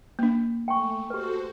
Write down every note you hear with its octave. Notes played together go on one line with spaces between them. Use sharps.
A#3 D4
A3 G5 G#5 C#6
F#4 G4 A4 B4 C5